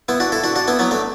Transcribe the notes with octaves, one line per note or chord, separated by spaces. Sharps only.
B3 E4
D4 F#4
E4 A4
D4 F#4
D4 F#4
B3 E4
F#3 B3
A3 D4